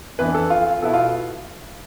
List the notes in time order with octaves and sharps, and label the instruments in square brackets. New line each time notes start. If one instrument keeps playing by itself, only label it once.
[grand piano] F2 E3 B3 D4 B4
A4
F4
F4
B2 B3 E4 A4
F4